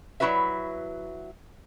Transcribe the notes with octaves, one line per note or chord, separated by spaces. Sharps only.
F#3 E4 F#4 B4 E5